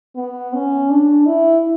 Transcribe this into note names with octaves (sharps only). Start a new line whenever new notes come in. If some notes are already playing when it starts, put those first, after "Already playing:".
B3
C#4
D4
E4